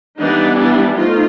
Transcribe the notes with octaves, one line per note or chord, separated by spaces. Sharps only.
E3 G3 B3 D4 D#4
D4 E4
F3 A3 D#4 F4